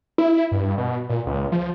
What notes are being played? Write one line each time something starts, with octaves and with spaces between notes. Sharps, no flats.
E4
G2
B2
A#2
C#2
F3